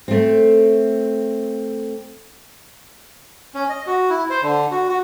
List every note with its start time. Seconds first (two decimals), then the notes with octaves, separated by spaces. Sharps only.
0.08 A3 C4
3.55 C#4
3.70 D#5
3.87 F#4
4.10 E4
4.30 C5
4.43 D3
4.71 F#4
4.89 F#4